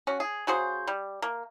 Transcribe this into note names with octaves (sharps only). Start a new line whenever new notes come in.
C#4 F#4
G#4
C#3 F#4 G#4 C5
G3
A#3